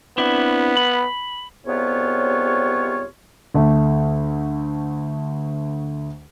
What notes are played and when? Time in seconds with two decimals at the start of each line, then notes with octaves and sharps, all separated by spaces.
0.18 B3 C4 D4 E4
0.77 B5
1.66 C2 G#2 C3 B3 F4 C#5
3.54 D2 A3